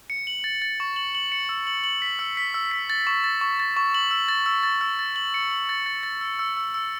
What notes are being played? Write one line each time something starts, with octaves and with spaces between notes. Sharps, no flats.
C#7
F#7
A6
A6
C#6
F#7
F#7
C#7
E6
F#7
F#7
B6
E6
B6
E6
B6
A6
C#6
A6
C#6
A6
C#6
F#7
E6
A6
E6
A6
E6
A6
F#7
C#7
F#7
A6
A6
A6
E6
E6
E6
E6